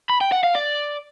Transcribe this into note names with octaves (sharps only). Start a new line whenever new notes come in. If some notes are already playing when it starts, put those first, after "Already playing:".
B5
G5
F#5
F5
D5